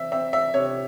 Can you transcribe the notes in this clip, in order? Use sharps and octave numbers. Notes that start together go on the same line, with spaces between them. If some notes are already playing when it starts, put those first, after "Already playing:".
Already playing: E3 C4 E5
C4 E5
E5
C3 C#5